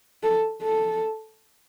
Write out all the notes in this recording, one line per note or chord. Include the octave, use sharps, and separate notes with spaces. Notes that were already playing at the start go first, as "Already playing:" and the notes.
A4
A4